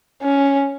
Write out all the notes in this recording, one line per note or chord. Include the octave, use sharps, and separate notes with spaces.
C#4